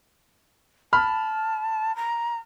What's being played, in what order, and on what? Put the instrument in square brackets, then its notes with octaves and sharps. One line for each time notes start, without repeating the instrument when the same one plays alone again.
[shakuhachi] A5 [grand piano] B5 F6
[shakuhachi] A#5